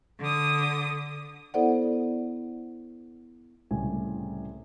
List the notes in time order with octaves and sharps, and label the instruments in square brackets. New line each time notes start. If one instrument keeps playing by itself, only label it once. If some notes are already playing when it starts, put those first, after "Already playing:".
[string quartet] D3 D#6
[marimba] B3 E4 A4 C5 D5 F#5
[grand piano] C2 A2 C#3 G#5